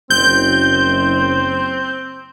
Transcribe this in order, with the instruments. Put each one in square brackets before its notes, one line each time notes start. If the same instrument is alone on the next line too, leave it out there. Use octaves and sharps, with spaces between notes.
[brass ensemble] F#1 [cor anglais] C4 [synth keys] G6